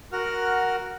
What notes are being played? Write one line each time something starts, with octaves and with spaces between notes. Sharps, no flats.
F#4 A#4 F#5 F6